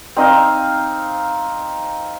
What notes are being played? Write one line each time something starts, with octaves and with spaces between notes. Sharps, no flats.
C4 D#4 D#5 F5